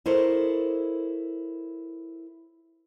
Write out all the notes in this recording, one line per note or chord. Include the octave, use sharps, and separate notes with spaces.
E4 A4 A#4 C5 C#5 D#5